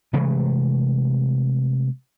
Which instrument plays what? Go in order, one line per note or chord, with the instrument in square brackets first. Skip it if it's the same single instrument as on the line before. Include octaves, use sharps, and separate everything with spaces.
[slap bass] C3 E3 G#3 A3